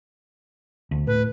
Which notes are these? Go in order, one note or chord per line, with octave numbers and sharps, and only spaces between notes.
D2
A2 B4